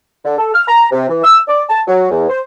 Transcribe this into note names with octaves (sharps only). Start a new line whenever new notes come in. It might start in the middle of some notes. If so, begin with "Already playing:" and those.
D3
A4
F6
A#5
C3
E3
E6
D5
A5
F#3
E2
C5